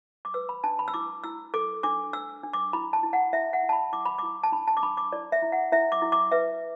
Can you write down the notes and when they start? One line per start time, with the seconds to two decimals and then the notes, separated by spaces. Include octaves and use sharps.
0.25 D6
0.34 B4 E6
0.49 B5
0.64 D4 A5
0.79 B5
0.88 E6
0.94 E4 D6
1.24 E4 E6
1.54 A4 D6
1.83 D4 D6
2.13 D4 E6
2.43 D4
2.53 D6
2.73 E4 B5
2.93 A5
3.03 E4
3.13 F#5
3.33 E4 E5
3.53 F#5
3.63 E4
3.69 A5
3.73 B5
3.92 E4 D6
4.06 B5
4.18 E4 D6
4.43 A5
4.52 D4 B5
4.67 A5
4.77 D6
4.83 D4 B5
4.97 D6
5.12 E4 D5
5.32 E5
5.42 E4
5.52 F#5
5.72 E4 E5
5.92 D6
6.02 E4
6.12 D6
6.32 B4 E5